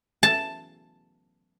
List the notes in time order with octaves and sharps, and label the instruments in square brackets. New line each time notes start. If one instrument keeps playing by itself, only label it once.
[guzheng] A5